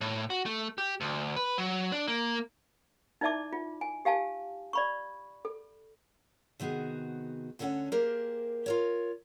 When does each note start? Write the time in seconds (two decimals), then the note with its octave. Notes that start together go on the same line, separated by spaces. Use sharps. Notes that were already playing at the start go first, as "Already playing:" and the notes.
0.01 A2
0.30 F#4
0.46 A3
0.78 G4
1.01 D2
1.36 B4
1.58 F#3
1.92 D4
2.08 A#3
3.21 D#4 E4 D5 E5 A5 D6
3.53 F4
3.81 G#5
4.05 G4 F5 G#5 A5
4.73 D5 B5 C#6
5.45 A4
6.60 C3 D#3 B3 F#4 G#4
7.59 D2 D3 C#4 A4 C#5 F#5
7.92 A#3 G4 G#4 A#4 C5
8.66 F4 A#4 C#5